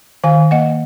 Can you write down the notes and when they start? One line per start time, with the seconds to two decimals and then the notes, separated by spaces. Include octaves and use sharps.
0.24 D#3 F5 G#5
0.51 A#3 D#5 F#5